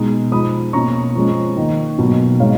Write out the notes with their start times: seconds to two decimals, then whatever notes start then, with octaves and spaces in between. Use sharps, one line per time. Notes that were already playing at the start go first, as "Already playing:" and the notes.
Already playing: B2 G#3 D#4 D#6
0.32 F3 G#3 D#4 B5 D#6
0.73 B2 A#3 C#4 A#5 C#6
1.15 F3 G#3 C#4
1.56 D#3 A#3 D#4
1.98 B2 F#3 A#3 D#4
2.40 B2 G#3 B3 D#4 C#5 F5